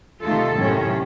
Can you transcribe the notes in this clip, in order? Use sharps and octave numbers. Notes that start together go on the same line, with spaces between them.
C3 D#3 A3 D#4 F4 A4
F#2 A2 C3 D#3 C#4